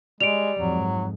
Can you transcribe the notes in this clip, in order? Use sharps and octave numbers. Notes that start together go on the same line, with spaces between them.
G3 G#3 D7 F7
F2 G#2 F#3